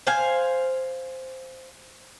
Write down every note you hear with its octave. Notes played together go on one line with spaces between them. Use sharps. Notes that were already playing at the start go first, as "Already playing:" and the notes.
C5 F5 G#5